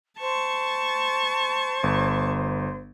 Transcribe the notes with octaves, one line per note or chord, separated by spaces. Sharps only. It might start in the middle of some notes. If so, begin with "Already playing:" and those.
C5 A5 C#6
G1